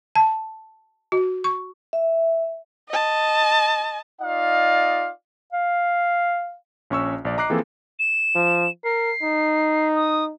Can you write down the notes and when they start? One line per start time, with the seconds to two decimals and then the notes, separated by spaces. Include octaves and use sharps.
0.15 A5
1.12 F#4
1.44 C#6
1.93 E5
2.89 D#5 A5
4.21 D#4 F4 D5 D#5 F5
5.53 F5
6.90 A#1 C#4 C#6 E6
7.25 A#1 D5
7.37 D#5 A#5 D6 F#6 C7
7.50 E3 F3 A#3 C4 G#4 A4
7.99 E7
8.35 F3
8.84 A#4 C7
9.22 D#4
9.96 D#6